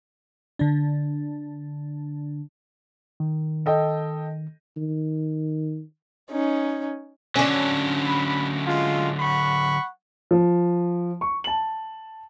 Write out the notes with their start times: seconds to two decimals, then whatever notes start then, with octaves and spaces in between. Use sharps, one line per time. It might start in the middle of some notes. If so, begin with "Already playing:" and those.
0.59 D3 D4
3.20 D#3
3.66 A4 D#5 G5
4.77 D#3
6.31 C#4 D#4
7.36 D3 F#3 C#4 D4
8.03 B5
8.66 G#3 F4
9.20 F#5 B5 C#6
10.31 F3
11.21 C#6
11.44 A5 F#7